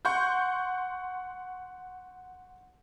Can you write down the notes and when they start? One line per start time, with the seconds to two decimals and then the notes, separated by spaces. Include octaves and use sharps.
0.05 F#5 C6 C#6 G6